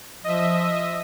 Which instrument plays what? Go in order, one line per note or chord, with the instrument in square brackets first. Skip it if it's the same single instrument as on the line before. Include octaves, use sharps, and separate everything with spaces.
[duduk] F3 [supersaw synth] D#5 E5